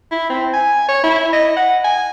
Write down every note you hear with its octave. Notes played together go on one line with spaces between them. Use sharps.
E4
C4
G#5
C#5
E4
D#5
F#5
G#5